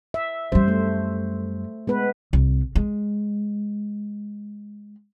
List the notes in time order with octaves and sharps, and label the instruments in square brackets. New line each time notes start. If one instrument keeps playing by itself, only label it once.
[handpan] E5
[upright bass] F#2 G3 [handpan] C5
[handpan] A3
G#3 B3 B4
[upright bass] C2
G#3